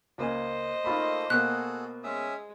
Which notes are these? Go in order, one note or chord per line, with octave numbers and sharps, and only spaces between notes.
C#2 A#3 C5 D#5 G#5
A3 A#3 D#4 F4 B5
B2 A#3 F#4 G#4 A4 F#6
G#3 C#4 E5 D#6